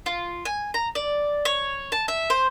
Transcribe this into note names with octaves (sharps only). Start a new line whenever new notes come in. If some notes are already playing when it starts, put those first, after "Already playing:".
F4
G#5
A#5
D5
C#5
A5
E5
C5